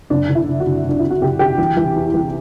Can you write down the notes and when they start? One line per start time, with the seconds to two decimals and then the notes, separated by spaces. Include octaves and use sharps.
0.10 F#1 D4
0.29 D3
0.35 E4
0.48 F#1
0.60 F#4
0.66 F#1
0.84 F#1 D4
0.99 E2 E4
1.10 F#4
1.21 F#1 G4
1.39 D3 G4
1.58 E3
1.77 E3
1.96 E2
2.14 E3